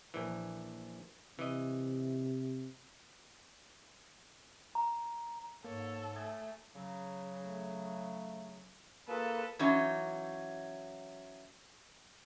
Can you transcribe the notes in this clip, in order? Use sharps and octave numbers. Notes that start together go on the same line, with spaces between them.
A#1 E3
C3 E3 D#5
A#5
G#2 A#3 A4 C#5
A3 G#5 D#6 G#6
C#3 F#3
A3
A#3 F4 G#4 A4 B4
E3 F#3 C#4 D#4